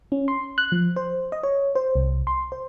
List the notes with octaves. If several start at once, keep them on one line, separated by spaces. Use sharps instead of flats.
C#4
C6
F#6
F3
C5
D#5
C#5
C5
C2
C6
C5